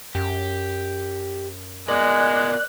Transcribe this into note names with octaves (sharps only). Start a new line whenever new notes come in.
F#2 G4
G#3 B3 F4 A#4 D5 F#6